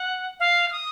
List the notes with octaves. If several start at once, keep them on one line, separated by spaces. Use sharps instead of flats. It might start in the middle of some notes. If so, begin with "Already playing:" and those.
Already playing: F#5
F5
F6
D#6